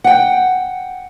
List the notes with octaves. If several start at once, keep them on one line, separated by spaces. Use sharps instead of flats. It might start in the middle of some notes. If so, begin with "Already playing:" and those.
F#5 G5